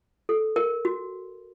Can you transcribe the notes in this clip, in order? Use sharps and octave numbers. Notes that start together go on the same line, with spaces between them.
A4
A#4
F#4